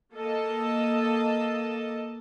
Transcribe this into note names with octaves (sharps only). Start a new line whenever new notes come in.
A#3 A4 D#5 A5